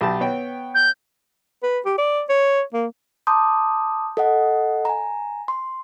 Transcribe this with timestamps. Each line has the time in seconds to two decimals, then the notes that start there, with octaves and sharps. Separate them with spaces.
0.01 B1 G4 A5
0.20 B3 C#5 G5
0.74 G6
1.63 B4
1.85 G4
1.98 D5
2.29 C#5
2.74 A#3
3.27 A5 A#5 C6 D6 D#6 G6
4.17 A4 D#5 F#5
4.85 G#5 A#5
5.48 C6